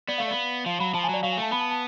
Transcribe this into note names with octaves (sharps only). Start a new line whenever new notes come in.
B3 D5
A3 F5
B3 D5
F3 F5
F#3 B5
F3 A5
G#5
F#3 D5
F#3 F5
G#5
A3 A5
B3 B5
A5
A5